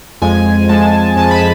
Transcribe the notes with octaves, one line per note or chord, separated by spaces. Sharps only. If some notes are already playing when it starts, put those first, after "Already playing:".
F2 F3 G#3 G#5
F2 F3 G#3 A5
F2 F3 G#3 A5
B5